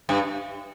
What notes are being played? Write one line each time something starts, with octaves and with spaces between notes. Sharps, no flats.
G2